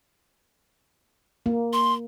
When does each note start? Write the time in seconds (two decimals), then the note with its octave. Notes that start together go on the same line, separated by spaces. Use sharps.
1.46 A#3
1.73 C6